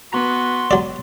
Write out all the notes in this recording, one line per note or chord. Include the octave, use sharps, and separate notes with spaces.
B3 F#4 A#5 C6
F#3 D5